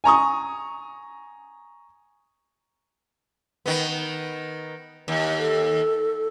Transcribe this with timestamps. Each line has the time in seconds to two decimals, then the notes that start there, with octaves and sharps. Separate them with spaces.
0.04 G#5 A#5 C#6 D#6
3.66 D#3 B3
5.08 D#2
5.39 A4